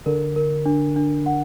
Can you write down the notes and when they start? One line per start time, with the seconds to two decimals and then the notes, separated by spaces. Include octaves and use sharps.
0.06 D3 A#4
0.36 A#4
0.66 D4
0.96 D4
1.26 F#5